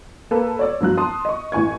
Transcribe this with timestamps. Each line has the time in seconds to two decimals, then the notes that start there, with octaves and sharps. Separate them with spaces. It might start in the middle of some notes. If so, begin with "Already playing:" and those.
0.31 A#3 A4 B4
0.59 C#5 D5 E6
0.80 G2 F3 F#3 F#6
0.98 A5 C6 D#6
1.25 D#5 C#6
1.52 A1 E3 G#5 C#6 G#6